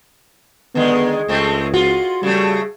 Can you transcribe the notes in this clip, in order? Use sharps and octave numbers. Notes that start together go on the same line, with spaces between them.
D3 D#3 G#3 B3
C#2 G#3 A3 C4
F4 F#4
C#3 G3 A3